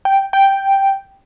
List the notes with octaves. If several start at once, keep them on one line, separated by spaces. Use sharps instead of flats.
G5
G5